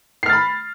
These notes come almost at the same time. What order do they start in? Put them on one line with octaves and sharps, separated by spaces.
C7 F6 A6 B5